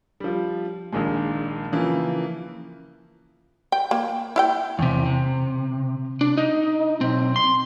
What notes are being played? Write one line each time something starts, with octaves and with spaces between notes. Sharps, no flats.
F3 G3
A#1 A#2 D#3 G#3
C#3 E3 F3 A#3
G5
A#3
E4 F5 G5
E2 C3
C3
D4
D#4
B1 C4
C6